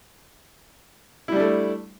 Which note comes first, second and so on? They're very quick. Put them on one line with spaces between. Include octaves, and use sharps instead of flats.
E4 G3 D4 A3